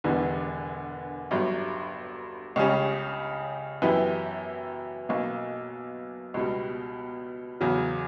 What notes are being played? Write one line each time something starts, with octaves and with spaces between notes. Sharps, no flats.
E1 E2 D3 G3 B3
G1 G2 F#3
C#2 C#3 G3 C#4 G4
F#2 E3 B3 E4 G4
B1 B2 A#3
C#2 B2 G3
E2 C#3 F#3